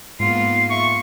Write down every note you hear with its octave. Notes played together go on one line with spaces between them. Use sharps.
G#2 A#3 B3 F4 C7
E5 C#6